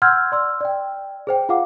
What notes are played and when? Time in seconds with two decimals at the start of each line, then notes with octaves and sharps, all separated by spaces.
0.02 F#5 C6 E6 F6 G6 G#6
0.32 D5 C6 E6
0.60 D5 G5
1.27 G#4 C5 G5
1.49 F4 G#4 F5 F#5 D6